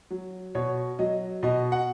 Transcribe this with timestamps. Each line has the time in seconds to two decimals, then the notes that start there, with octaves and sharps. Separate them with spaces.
0.11 F#3
0.55 B2 C#5
0.99 F#3 D#5
1.43 B2 D#5
1.72 F#5